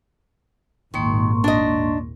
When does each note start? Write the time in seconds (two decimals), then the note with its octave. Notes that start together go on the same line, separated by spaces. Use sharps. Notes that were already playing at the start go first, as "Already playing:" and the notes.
0.94 G#1 D#2 A#2 D#3 A#3 C6 C#6
1.44 D4 D#5